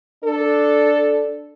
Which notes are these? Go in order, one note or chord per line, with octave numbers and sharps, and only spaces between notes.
D4 A4